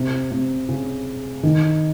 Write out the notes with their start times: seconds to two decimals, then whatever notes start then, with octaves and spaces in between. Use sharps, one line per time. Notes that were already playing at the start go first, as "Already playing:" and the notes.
Already playing: C3
0.31 C3
0.69 C#3
1.43 D#3